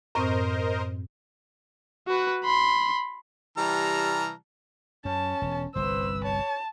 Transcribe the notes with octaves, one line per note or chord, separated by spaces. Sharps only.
F#2 A2 C4 A#4 C5 D#5
F#4 B4
B5 C6
C3 E3 G3 A5 A#5 F6
F#2 C#4 A5
E1
G1 C2 B4 C5 E6
C#5 A5